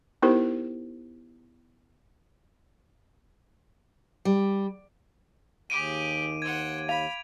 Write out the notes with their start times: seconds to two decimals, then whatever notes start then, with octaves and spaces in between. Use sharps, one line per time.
0.22 B3 D#4 E4 G4 A#4 C5
4.25 G3
5.70 D#2 G4 G#4 D6 D7 D#7
6.42 C5 F#5 G#6
6.89 F5 B5 F7